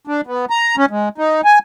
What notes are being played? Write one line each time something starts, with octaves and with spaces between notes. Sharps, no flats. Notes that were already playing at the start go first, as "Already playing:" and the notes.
D4
B3
A#5
C#4
G#3
D#4
G#5